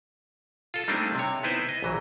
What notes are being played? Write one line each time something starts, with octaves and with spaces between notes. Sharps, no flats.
F4 A4
G3 A3 A#3 C4 D4 D#4
C3 C#5
B3 D#4 E4 B4 C5 E5
D#5
A#1 E3 F#3